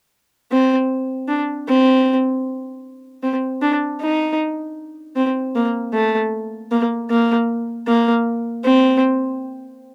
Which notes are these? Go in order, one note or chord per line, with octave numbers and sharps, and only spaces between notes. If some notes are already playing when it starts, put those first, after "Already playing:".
C4
D4
C4
C4
D4
D#4
C4
A#3
A3
A#3
A#3
A#3
C4